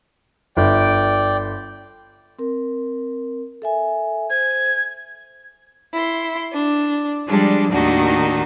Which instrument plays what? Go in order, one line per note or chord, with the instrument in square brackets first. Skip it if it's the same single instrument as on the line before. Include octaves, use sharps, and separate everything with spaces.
[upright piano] G1 [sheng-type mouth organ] D5 G5
[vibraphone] C4 A#4
A4 E5 G#5
[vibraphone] C5 [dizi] G#6
[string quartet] E4 C6
D4
F3 G3 G#3 D4
D#2 A2 D#3 D4 D#4 F#4